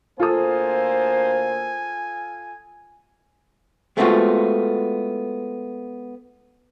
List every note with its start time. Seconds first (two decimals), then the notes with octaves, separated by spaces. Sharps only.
0.20 D2 A#3 F4 A4 C5 G#5 D#6
3.97 G#3 A3 B3 C4 F4 F#4